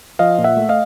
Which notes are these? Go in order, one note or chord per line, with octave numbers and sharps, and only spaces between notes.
F3 D#5 F5
A#2
E5 F#5
A3
D#5 F5